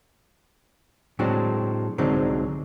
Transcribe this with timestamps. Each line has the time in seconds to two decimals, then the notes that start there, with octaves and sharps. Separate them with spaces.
1.19 A2 F#3 G#3 C4 D4 F#4
1.98 C2 D3 F#3 G#3 C4 D#4